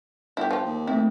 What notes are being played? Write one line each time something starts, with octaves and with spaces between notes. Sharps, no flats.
G1 E4 G4
F3 G4
D#2
A3 C4 E4